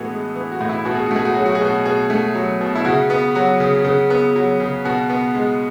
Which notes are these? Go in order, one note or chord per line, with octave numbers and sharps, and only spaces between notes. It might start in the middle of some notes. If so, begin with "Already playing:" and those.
Already playing: A2 E3 B3 F#4 G#4 A4
G#3
E3
F#4
A2
E4
B2 F#4
G#4
F#4
A3 G#4
F#4
F#3 G#4
F#4
G#4
B2 F#4
B2 G#4
A3
F#3
B2
E4
C#3 F#4
B3
F#3 F#4
C#3
C#3
B3
F#3
C#3
B2 F#4
B3
G#3